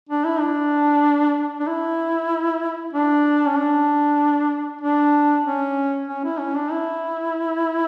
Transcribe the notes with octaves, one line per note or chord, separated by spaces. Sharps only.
D4
E4
D4
D4
E4
D4
C#4
D4
D4
C#4
C#4
E4
C#4
D4
E4